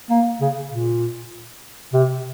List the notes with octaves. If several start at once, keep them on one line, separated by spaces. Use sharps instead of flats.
A#3
C#3
A#2
C3